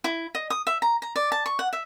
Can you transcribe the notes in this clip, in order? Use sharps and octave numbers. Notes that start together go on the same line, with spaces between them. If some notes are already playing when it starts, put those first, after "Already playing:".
E4
D#5
D#6
E5
A#5
A#5
D5
A5
C#6
F#5
E5